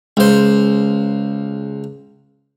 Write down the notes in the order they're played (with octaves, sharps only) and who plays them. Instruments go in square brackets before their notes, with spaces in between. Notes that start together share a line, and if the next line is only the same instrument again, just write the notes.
[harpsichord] C#2 C5